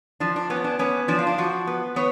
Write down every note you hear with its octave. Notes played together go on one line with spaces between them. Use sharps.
F3 D4
D4
B3 C#4
D4
B3 C#4
F3 D4
F4
D4
F3 F#4
B3
B3 C#5